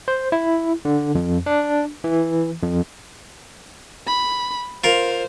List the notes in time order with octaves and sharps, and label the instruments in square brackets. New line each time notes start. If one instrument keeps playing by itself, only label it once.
[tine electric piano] C5
E4
D3
F2
D4
E3
F2
[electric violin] B5
[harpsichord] F4 A#4 [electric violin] C5